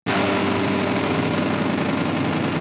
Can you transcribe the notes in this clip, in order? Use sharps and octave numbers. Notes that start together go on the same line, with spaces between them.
B1 G2